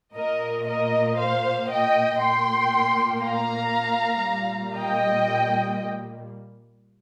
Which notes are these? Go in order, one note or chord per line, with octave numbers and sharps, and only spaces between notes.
A#2 A#3 A#4 D#5
A#4 D#5
C5 F5
D#5 G5
A#2 A#3 G5 C6
F5 A#5
A#2 G3 A#3
D#5 G5